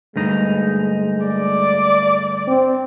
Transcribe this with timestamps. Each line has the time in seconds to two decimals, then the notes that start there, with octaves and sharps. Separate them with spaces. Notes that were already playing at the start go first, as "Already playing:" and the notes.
0.16 D2 G2 G#3 D#4
1.26 D5
2.47 C4